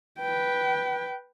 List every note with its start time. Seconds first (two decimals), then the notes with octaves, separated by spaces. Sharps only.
0.19 B4 G5